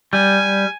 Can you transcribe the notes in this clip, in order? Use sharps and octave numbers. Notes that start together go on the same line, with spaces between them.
G3 G#5